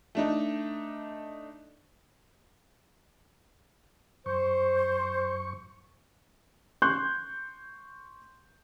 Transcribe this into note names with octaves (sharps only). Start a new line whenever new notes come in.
A3 D4 D#4
F#2 C5 C#6
C6 C#6 F#6 G6